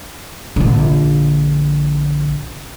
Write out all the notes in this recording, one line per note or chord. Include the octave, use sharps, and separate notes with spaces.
A#1 D3